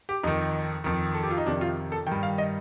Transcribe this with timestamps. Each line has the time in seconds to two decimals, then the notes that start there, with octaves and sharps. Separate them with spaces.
0.09 G4
0.23 F2 D#3 D#4
0.84 F2 D#3
1.14 A4
1.23 G4
1.31 F4
1.38 D#4
1.46 F2 C3 D#3 D4
1.61 F4
1.92 A4
2.07 D#3 G5
2.11 G2
2.23 F5
2.38 D#5